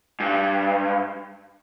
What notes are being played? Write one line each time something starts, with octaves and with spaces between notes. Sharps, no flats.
G2